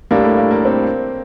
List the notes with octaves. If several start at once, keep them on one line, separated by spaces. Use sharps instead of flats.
A2 G3 A#3 D4
A3
A#3
A#3
C4